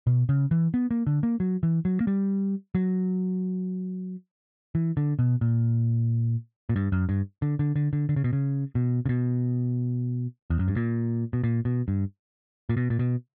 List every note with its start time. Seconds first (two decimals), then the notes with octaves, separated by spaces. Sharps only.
0.07 B2
0.29 C#3
0.51 E3
0.74 B3
0.91 A#3
1.07 D3
1.23 A#3
1.40 F#3
1.63 E3
1.85 F#3
2.01 A#3
2.07 G3
2.75 F#3
4.75 E3
4.97 D3
5.19 B2
5.41 A#2
6.69 A#2
6.76 G2
6.92 F#2
7.09 G2
7.42 D3
7.59 D3
7.76 D3
7.93 D3
8.09 D3
8.16 C#3
8.24 B2
8.33 C#3
8.75 B2
9.06 C#3
9.09 B2
10.50 E2
10.59 F#2
10.68 G2
10.76 A#2
11.33 B2
11.44 A#2
11.65 B2
11.88 G2
12.69 A#2
12.77 B2
12.90 A#2
12.99 B2